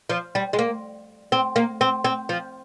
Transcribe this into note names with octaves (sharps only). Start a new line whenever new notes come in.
F3
G3
G#3
A#3
C4
A#3
C4
C4
F3